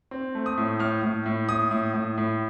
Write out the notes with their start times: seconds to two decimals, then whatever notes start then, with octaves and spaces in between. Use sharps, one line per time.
0.11 C4
0.35 A3
0.46 D#6
0.58 A2
0.79 A2 F6
1.03 A2
1.26 A2
1.49 A2 D#6
1.71 A2
1.94 A2
2.18 A2